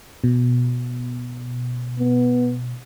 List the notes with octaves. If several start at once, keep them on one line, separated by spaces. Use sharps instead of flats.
B2
B3